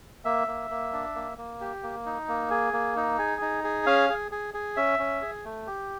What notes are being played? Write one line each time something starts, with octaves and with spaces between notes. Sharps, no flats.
A#3 E5
A#3
A#3
D4
A#3
A#3
G4
A#3
D#4
A#3
G#4
A#3
D#4
G#4
D#4
G#4
C#4 F5
G#4
G#4
G#4
C#4 E5
C#4
G#4
A3
G4